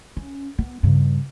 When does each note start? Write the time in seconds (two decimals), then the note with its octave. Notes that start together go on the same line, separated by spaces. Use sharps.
0.17 C#4
0.58 B3
0.83 G2 C#3